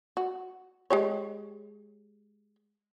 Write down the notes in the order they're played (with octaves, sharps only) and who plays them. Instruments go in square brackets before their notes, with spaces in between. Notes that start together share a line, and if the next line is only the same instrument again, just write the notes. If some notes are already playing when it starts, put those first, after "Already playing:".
[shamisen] F#4
G#3 G4 C#5